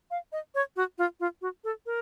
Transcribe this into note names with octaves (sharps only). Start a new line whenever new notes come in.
F5
D#5
C#5
F#4
F4
F4
F#4
A4
A#4